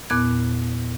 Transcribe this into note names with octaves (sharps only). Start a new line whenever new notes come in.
E2 A#2 B3 D6 F#6 G#6